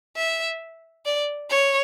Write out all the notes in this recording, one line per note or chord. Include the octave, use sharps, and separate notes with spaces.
E5
D5
C#5